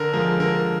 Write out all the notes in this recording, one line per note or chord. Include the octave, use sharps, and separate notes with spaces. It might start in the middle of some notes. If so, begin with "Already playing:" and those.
Already playing: D3 A#4
F3 G#3 A#4
D3 A#4